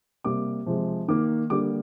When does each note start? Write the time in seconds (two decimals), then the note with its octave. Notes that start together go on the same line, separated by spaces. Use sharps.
0.24 C3 G3 A#3 D6
0.66 C3 F3 G#3
1.08 D#3 A#3 D6
1.50 D3 G3 A#3 D6